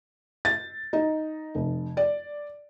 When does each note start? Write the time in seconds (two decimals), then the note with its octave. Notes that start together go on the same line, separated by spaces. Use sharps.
0.45 A6
0.93 D#4
1.55 F1
1.97 D5